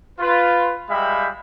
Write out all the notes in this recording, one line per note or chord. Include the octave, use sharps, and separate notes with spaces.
F4 B4
G3 G#3 E5 F5 G5 B5